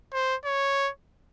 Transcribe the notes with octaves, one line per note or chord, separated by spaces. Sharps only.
C5
C#5